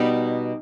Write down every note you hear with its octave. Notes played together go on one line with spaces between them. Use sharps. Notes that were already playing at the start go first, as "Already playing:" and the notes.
Already playing: B2 G3 B3 D#4